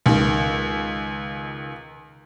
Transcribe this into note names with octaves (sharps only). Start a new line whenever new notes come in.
C#2 D#3